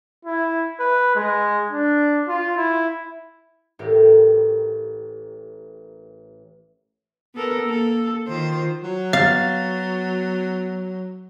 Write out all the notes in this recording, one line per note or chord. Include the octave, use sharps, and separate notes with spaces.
E4
B4
G#3
D4
F4
E4
A1 A2 G4 A#4
B3 A4 A#4
A#3 A4
D#3 F4 C5
F#3
B3 F5 A6